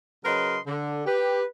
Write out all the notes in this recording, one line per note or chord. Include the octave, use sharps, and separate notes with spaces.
C#3 F#3 A#4 B4 D#5 C6
D3
G4 B4